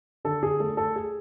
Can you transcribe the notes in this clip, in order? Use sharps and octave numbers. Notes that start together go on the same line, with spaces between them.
D3 A4
G#4
A3 A4
A4
G#4